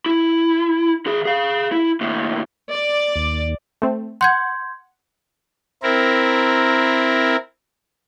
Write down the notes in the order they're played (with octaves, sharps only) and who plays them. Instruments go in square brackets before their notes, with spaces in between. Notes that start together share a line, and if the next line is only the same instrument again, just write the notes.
[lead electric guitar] E4
D#3 G#4
G#4 F5
E4
D#2 A2
[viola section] D5
[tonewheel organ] D#2
[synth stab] A3 C4
[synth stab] F#5 [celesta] C6 G6 G#6
[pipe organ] C4 E4 A#4